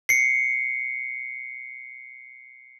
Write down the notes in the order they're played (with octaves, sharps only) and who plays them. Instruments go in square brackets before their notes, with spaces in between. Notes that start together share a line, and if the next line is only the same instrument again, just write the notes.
[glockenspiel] C7 C#7